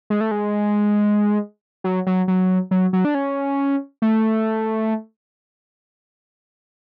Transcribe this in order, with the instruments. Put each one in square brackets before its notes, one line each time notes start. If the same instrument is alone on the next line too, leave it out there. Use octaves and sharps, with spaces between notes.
[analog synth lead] G#3
A3
G#3
F#3
F#3
F#3
F#3
F#3
D4
C#4
A3